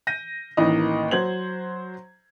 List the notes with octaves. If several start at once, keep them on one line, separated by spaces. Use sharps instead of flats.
G6 A#6 D#7
A1 D#3 E3 A#3 D#5
F#3 C5 G#6 F#7